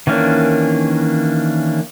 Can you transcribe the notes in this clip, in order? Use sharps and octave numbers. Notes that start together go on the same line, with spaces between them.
D#3 E3 A#3 C#4 D4